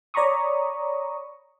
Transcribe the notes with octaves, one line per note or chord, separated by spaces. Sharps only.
C#5 D5 A#5 B5 C#6 D#6